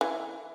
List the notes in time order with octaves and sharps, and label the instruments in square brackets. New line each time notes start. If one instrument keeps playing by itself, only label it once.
[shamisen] E3